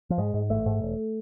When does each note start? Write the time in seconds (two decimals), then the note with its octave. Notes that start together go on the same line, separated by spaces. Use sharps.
0.10 F3
0.18 G#2 G#3
0.34 G#2
0.50 A1 A3
0.66 G#2
0.82 E1